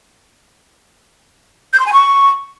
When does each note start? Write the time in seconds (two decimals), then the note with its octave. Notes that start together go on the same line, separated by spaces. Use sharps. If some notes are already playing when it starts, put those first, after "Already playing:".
1.73 G6
1.80 C6
1.86 G#5
1.93 C#6